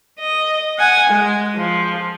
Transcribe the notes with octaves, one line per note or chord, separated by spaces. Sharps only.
D#5
F#5 G#5
G#3
F3